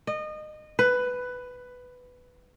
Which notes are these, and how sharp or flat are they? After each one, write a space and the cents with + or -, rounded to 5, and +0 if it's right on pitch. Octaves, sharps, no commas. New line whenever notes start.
D#5 -25
B4 +10